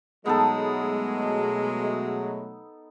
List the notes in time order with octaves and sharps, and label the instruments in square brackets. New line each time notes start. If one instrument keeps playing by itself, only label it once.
[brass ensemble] B2 F#3 A3 [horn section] G#3 [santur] B3 D#4 A4